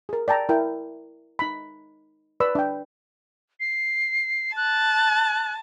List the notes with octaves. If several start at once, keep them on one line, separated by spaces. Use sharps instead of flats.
G#4 A#4
D5 G5 A5 A#5
E4 A#4 G5
D#4 B5
B4 D5 B5 E6
D4 G5
C7
A5 F#6